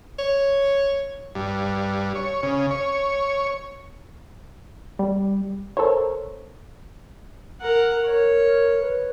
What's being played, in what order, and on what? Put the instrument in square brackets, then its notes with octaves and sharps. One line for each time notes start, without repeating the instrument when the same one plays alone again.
[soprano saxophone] C#5
[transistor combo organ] G2
C#5
C#3
C#5
[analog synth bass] G3
[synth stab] A4 A#4 C5 C#5
[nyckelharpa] A#4 F#5
[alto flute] A#4 [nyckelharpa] C#5
[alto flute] B4